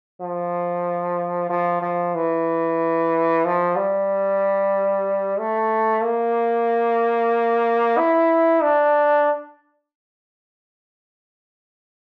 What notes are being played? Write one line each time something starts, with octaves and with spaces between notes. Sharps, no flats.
F3
F3
F3
E3
F3
G3
A3
A#3
E4
D4